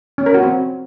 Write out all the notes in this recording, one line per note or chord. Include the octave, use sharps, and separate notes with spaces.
C#4
A#4
F#4
C4